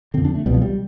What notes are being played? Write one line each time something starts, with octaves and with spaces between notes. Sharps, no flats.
F2 D3 C4
D4
A3
C2 B2 G3
F3
G3